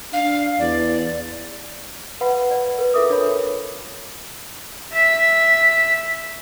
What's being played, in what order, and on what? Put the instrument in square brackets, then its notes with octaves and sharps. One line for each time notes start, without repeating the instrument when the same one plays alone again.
[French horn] D4 [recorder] F5
[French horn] E2 [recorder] D5
[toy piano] B4 F5 F#5 B5
D5
A#4 B4
F4 A4 A#4 E5 D6 D#6
D4 C#5 B5
[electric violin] E5 B6